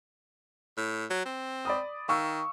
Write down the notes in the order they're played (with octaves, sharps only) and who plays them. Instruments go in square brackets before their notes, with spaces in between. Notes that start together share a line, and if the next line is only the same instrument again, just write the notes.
[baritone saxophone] A2
F#3
C4
[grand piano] D5 B5 D#6
[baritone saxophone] D#3 [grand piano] F5 C#6 E6